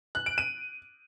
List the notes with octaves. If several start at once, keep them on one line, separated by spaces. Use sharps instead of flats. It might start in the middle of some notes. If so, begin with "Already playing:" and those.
F#6
D7
D#7